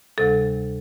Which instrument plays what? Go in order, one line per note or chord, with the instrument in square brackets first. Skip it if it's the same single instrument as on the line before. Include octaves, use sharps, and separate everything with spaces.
[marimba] D2 C3 G3 A4